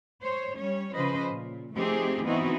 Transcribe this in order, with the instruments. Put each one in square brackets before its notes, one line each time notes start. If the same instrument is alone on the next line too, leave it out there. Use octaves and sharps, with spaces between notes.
[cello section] C5 C#5
G3 C#4 C#5
C#3 F3 B4 C5 D#5
A#2
F3 A3 C4 D#4 G4 G#4
E3 B3 C4 D#4 E4 F#4